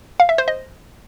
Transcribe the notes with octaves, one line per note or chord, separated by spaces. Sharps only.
F5
E5
C5
D#5